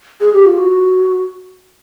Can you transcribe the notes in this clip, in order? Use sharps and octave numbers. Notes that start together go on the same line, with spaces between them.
G#4
G4
F4
F#4